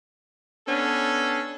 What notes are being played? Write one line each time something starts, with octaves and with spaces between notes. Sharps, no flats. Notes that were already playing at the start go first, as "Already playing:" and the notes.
B3 C#4 D4 A4